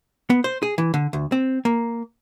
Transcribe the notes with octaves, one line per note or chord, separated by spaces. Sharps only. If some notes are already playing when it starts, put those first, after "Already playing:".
B3
C5
G#4
E3
D3
D2
C4
A#3